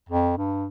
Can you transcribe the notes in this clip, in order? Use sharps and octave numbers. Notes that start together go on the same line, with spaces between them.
F2
G2